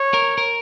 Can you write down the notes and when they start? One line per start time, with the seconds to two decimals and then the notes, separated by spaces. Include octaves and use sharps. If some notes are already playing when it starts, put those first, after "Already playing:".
Already playing: C#5
0.14 A#4
0.38 A#4